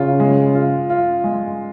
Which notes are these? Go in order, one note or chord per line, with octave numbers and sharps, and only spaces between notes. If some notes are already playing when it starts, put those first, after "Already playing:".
Already playing: C#3 F4
G#3
F4
F4
G#3